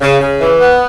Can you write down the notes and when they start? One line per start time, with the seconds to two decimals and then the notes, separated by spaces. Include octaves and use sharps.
0.01 C#3
0.20 C#3
0.40 E3
0.60 B3